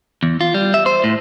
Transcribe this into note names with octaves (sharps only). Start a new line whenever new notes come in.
E2
F4
G3
E5
C5
A2